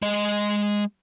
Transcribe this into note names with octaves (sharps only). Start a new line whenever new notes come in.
G#3 D#5